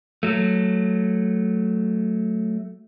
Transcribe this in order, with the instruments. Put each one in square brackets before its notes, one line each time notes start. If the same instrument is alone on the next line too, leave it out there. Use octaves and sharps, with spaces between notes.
[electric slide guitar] F#3 A3